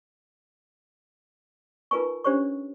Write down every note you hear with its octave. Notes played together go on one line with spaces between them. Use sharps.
D#4 F4 A#4 B4 G#5 C#6
C#4 D4 G4 C5 C#5 C#6